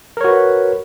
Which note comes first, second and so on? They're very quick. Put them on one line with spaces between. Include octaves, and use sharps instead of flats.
A#4 C#5 F#4 B4